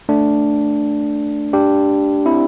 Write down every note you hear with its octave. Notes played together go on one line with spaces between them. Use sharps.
A3 D4
D4 G4
C4 E4